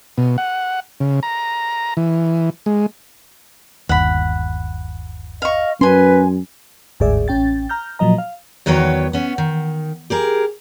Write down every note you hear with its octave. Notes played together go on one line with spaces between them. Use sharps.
B2
F#5
C#3
A#5
E3
G#3
G1 D#2 F#5 B5
D#5 F5 C#6
F#2 C#4 B4 G#5 C6
G1 D2 G#2 G#4 D5 E5
A1 C#4 G5 A6
A#5 F6 G6
A#2 F3 F#3 D#5 A#5
F5
E2 D#3 F#3 B4 C#5 G5
B3 C#4
D#3
G4 G#4 A#4